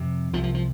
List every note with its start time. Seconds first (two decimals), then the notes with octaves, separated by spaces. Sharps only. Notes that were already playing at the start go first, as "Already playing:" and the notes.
Already playing: F2 C3
0.33 C2 C3 F3
0.43 F3
0.54 F3